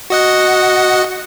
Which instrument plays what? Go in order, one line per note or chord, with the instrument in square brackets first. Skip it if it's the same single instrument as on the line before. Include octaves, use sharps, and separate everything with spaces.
[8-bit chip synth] F#4 D#5 F#5